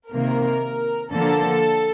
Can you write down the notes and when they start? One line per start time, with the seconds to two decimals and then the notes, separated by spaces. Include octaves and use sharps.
0.11 C3 D#3 A#3 A#4
1.12 D3 F3 A#3 A4